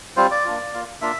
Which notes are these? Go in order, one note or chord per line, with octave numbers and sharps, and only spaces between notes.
G3 C4 F4 C5
D5
A#3 D4 F4
A#3 F4
A#3 D4 F4 E5